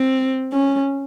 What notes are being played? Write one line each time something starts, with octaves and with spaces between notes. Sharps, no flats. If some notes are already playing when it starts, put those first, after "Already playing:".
Already playing: C4
C#4